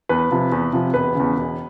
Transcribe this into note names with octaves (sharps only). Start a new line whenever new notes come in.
E2 B4
C3 F3
E2
C3 F3
E1 B4
E2 C#3
E1